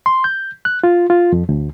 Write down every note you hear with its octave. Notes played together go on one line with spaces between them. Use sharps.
C6
G6
F#6
F4
F4
F2
D2